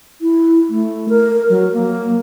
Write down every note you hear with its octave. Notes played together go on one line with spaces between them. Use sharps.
E4
A3
A#4
F#3
A#3